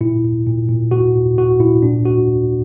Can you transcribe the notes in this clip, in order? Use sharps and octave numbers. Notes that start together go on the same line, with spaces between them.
A#2 E4
A#2
A#2
A#2
A#2 F#4
A#2
A#2 F#4
A#2 E4
A#2 D4
A#2 F#4